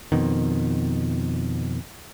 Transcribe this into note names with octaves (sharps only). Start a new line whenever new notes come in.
F2 B2 D#3